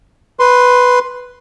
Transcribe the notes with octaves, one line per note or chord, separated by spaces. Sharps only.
B4 C6